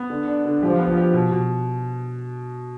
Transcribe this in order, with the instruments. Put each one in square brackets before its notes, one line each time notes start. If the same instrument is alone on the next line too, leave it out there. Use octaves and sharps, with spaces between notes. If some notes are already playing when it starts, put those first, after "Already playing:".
Already playing: [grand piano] B3
D3
D4
D3
[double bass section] F3 [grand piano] G4
[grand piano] B3
G4
B2
B2